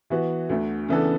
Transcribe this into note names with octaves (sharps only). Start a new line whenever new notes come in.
E3 B3 F#4
D2 D3 A3
C#3 E3 B3 D4 A4